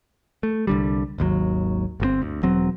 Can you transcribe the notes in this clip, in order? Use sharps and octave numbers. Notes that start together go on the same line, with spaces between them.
A3
C2 D3 G3
G#1 D#2 C3 F#3
G1 B2 C4
D2
E1 F#3 C4